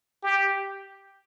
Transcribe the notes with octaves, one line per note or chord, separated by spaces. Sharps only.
G4